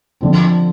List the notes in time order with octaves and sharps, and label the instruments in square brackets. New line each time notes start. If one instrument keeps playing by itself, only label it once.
[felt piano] D3 F3 C4